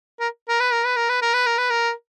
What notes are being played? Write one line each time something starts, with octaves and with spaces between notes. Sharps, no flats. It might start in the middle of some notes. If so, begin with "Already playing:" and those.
A#4
A#4
B4
A#4
B4
A#4
B4
A#4
B4
A#4
B4
A#4